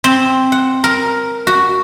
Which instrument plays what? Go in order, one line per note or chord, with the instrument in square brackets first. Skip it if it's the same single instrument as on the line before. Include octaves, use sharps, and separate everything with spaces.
[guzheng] C4
F#5
A#4
F#4